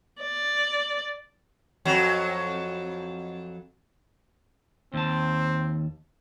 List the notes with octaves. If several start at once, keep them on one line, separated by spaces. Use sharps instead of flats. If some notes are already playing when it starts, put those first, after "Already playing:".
D5
F2 F#3
D#2 C4 A5